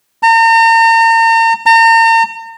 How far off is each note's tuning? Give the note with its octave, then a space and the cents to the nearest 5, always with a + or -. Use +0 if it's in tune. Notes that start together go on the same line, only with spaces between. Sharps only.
A#5 -40
A#5 -40